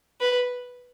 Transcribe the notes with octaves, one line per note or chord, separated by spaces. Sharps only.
B4